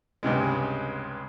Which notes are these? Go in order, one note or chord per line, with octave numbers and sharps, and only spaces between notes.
C#2 G2 C3 G#3